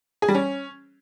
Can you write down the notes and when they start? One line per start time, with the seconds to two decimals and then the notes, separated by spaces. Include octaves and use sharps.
0.22 G#4
0.28 G3
0.35 C#4